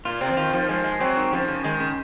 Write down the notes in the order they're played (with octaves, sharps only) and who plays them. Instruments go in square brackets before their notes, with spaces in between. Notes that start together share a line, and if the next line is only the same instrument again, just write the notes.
[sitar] A#2 [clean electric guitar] F4
[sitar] C3 [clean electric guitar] C4
[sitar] F3
[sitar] D#3 [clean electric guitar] F4
[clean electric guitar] D#3 [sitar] F3
[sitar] F3 [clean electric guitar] G#3
[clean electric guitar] G#3
[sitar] F#3 [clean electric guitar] C4
[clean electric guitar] D#3
[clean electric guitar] C#3 [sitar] F3
[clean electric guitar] C#3
[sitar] D#3 [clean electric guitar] G#3
[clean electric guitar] C#3